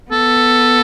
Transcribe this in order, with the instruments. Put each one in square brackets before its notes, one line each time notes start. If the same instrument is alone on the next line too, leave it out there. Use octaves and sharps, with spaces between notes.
[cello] B3 [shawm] A4